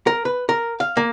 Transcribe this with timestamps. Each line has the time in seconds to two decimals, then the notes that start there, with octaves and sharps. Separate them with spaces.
0.07 A#4
0.25 B4
0.49 A#4
0.80 F5
0.97 A#3